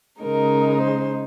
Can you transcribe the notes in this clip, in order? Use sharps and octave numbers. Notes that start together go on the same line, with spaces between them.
C#3 G#3 D#4 A#4
C5